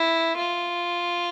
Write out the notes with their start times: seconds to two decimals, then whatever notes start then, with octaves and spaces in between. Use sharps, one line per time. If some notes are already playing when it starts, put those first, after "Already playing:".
Already playing: E4
0.39 F4